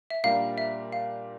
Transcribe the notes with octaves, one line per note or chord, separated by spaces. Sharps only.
E5
A#2 G3 D4 G4 A#4 F5
E5
F5